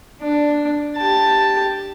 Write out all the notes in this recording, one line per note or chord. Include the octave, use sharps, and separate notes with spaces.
D4
G4 A5